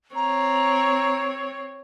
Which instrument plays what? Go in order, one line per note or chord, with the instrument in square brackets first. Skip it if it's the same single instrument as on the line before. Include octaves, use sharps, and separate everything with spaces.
[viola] C4 C#5 [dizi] A#5